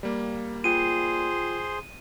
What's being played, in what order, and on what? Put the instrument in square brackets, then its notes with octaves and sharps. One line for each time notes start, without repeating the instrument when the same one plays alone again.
[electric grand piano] G3 A#3
[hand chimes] F4 G5 [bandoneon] G#4 C5 C6 [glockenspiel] D#7